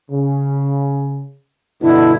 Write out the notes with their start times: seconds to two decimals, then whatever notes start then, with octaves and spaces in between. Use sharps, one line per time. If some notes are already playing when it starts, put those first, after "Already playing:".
0.11 C#3
1.82 G2 B2 D3 E4